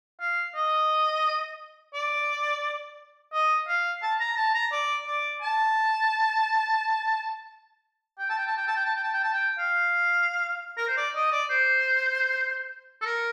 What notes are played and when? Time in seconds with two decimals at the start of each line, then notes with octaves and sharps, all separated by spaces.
0.20 F5
0.55 D#5
1.94 D5
3.33 D#5
3.68 F5
4.02 A5
4.20 A#5
4.37 A5
4.54 A#5
4.72 D5
5.07 D5
5.42 A5
8.19 G5
8.29 A5
8.38 G5
8.47 A5
8.57 G5
8.67 A5
8.76 G5
8.85 A5
8.96 G5
9.04 A5
9.14 G5
9.23 A5
9.33 G5
9.59 F5
10.77 A#4
10.88 C5
10.97 D5
11.15 D#5
11.32 D5
11.50 C5
13.01 A4
13.05 A#4